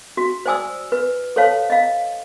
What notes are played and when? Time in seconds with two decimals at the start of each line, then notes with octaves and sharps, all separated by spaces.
0.17 F#4
0.46 C5 D5 G#5 D#6 E6
0.92 B4
1.36 A4 C5 C#5 F5 A5
1.70 D#5 F5